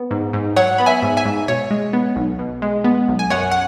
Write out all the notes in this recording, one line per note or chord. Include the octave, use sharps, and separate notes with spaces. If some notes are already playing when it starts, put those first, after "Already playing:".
Already playing: B3
G#2
G#2
F#3 C#5 F#5
B3 B5
E5 G#5
G#2
E5 G#5
G#2
B2 C#5
G#3
B3
B1
B2
G#3
B3
B1
G#5
F#2 C#5 F#5
F#5